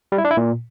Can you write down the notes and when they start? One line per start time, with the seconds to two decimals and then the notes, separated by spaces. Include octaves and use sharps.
0.12 G3
0.18 E4
0.25 D4
0.31 E4
0.37 A#2